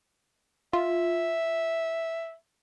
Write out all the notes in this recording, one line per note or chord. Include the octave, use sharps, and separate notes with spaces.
F4 E5